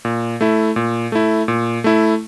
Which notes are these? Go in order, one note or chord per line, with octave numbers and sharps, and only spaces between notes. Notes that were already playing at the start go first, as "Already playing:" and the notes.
A#2
A3 E4
A#2
A3 E4
A#2
A3 E4